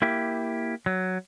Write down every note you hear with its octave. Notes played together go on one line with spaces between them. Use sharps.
A#3 E4 G4
F#3